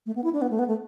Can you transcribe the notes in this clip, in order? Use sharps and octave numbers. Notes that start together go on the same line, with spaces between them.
A3
B3
E4
D4
B3
A3
B3
A3